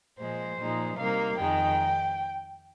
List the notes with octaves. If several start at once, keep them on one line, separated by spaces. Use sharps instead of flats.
A#2 F3 G#3 C5
A#2 F3 G#3 D#4
C3 G3 A#3 D#4 F5
F2 D#3 G#3 D#4 G5